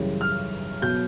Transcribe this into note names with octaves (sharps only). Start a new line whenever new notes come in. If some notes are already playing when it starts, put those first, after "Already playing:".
Already playing: F#2 C#3 E3 G3
F6
B2 F#3 G6